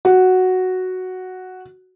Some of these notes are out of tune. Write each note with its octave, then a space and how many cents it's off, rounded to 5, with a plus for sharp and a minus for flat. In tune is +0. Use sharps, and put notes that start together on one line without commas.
F#4 +0